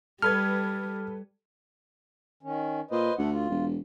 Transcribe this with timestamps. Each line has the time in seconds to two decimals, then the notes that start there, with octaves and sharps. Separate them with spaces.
0.22 G3 A4 B4 F6 G#6
2.43 D#3 C#4
2.91 A#2 B4 C5 D#5
3.18 D2 A3 F#5
3.32 F4
3.49 E1